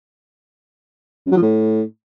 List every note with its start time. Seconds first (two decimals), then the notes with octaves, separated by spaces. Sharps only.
1.26 F#2
1.32 F#3
1.37 F3
1.42 A2